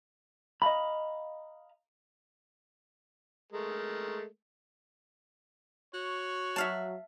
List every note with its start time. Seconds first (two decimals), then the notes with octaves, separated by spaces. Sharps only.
0.62 D#5 F5 A#5 B5
3.52 G#3 A3 A#4
5.94 F#4 C#5
6.56 F#3 E5 F5 A5